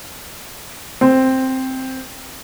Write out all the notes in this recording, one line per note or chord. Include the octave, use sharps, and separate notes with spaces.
C4